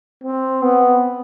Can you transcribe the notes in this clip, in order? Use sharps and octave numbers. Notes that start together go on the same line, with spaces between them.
C4
B3